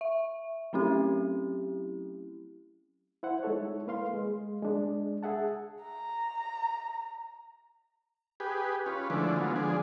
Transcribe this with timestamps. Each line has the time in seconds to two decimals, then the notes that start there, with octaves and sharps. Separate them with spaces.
0.01 E5
0.73 F#3 A3 C4 C#4 E4 G4
3.23 E4 C5 F#5
3.43 G#3 D#4 E4 A4 C#5
3.87 A#3 B4 F5 C6
4.14 G#3
4.63 G#3 D4
5.23 G#4 E5 F#5 A5
5.83 A#5
8.40 G4 G#4 B4
8.86 C#4 F4 B4
9.10 D3 E3 F3 G#3 A3 D4
9.36 F#3 G#3 B3 F4
9.56 D3 F3 G#3 D4 G#4